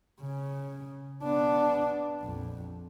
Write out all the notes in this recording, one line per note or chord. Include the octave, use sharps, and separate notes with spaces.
C#3
B3 D4
A#1 F2